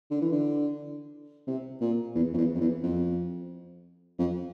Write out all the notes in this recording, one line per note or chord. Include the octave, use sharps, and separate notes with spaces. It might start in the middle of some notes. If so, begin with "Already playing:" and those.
D3
E3
D3
C3
A#2
E2
F2
E2
F2
E2
F2
F2